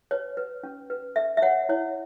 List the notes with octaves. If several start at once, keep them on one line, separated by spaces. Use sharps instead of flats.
B4 C#5
B4
C#4
B4
A4 E5
E5
C#5 F#5
E4 C#5